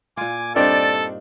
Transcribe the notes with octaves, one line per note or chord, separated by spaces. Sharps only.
A#2 F4 G#5 D6
G2 C4 D4 D#4 A4 A#4 D5